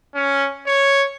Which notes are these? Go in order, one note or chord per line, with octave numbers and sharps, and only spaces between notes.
C#4
C#5